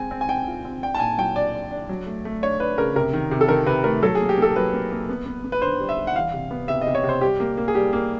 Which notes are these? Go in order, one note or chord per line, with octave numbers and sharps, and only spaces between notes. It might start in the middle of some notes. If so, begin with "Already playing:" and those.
Already playing: G#3 C4 G#5
C4
G#5
C4 G5
F4
C4
D4 G5
A5
A#2 G#5
F#3 G5
D4 D5
D4
D4
F#3
A3
A3
D4 C#5
D4 B4
C#3 A#4
C3 A#4
D#3
C3
A4
D#3 A#4
C3 B4
A3 A#4
F#3 A4
G#4
A#3
G4
A#3 A4
F#3 B4
A#3
A#3
B3
B3
B3
B4
D3 C5
G3
E5
G3
F#5
E3 F5
C3
B3
C3 E5
D#5
C3
C#5
C3
C5
G3 G4
A#3
A#3
G#4
G3 G4
A#3